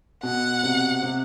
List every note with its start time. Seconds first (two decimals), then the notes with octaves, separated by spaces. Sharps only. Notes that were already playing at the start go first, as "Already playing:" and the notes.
0.23 B2 F#5
0.63 C3
1.03 C3